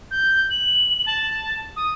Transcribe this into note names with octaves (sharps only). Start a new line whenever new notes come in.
G6
F#7
A5
D#6